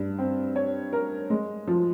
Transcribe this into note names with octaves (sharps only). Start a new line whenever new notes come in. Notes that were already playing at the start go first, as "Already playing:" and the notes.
Already playing: G2
C4
C#5
A#4
G#3
F3